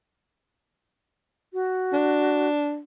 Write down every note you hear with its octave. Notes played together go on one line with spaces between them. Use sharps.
F#4
D4